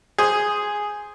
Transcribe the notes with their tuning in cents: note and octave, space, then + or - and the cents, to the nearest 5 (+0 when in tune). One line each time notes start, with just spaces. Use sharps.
G#4 +0 C5 +5